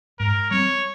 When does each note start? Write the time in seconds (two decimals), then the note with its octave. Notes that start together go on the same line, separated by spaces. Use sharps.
0.19 G#2 A#4
0.51 G3 C4 C#5